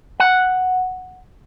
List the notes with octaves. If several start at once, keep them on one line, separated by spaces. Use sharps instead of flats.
F#5